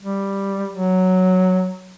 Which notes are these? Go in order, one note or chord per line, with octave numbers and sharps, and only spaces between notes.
G3
F#3